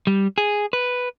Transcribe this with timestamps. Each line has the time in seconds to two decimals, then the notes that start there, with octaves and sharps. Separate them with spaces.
0.07 G3
0.38 G#4
0.73 B4